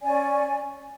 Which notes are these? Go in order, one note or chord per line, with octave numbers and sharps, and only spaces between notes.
C#4 D5 G#5